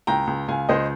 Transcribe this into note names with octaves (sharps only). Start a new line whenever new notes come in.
C#2 G5 A#5
C#2
C#2 F5 G#5
C#2 C5 D#5